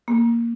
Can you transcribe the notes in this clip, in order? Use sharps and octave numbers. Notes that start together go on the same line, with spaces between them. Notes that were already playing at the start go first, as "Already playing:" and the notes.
A#3